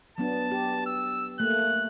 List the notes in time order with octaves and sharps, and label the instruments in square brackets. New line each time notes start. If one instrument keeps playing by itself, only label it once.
[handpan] F#3 B3 D4 [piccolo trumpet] A5
[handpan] G4
[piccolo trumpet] E6
[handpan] A3 A#3 [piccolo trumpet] F#6